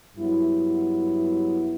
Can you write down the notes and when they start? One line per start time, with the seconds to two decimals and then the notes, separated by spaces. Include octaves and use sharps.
0.16 G2 F#3 B3 E4